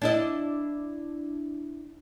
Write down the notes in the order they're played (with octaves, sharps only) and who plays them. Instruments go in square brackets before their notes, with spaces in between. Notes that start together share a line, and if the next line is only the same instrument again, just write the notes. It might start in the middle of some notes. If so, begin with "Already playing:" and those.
[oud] D4 E4 D#5